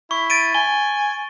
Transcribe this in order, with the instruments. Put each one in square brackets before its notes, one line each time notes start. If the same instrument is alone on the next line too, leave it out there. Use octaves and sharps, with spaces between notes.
[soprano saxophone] E4 [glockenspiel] C#6
[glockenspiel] A6 D7 D#7
[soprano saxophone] G#5 [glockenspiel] G7